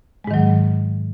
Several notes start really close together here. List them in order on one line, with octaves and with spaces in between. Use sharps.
G#3 G#2 D#3 F#3